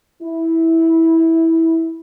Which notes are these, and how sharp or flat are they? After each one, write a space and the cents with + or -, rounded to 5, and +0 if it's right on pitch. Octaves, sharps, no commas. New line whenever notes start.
E4 -15